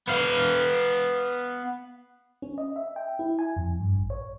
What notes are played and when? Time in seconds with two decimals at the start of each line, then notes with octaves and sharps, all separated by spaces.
0.07 B3 F5
2.42 C#4
2.58 D#5
2.76 E5
2.96 G5
3.19 E4
3.39 G#5
3.56 F2
3.80 G2
3.96 A1
4.10 C#5